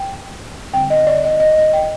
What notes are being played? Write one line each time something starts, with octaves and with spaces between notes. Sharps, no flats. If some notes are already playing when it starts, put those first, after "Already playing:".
Already playing: G5
D3 G3 C4 G5
D#5
D5
D#5
D#5
D#5
G5